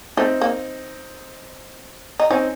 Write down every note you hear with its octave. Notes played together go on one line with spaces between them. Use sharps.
A3 C4 D#4
A#3
D#4
C4 C#4 D#4